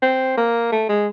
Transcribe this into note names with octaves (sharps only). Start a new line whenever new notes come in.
C4
A#3
A3
G#3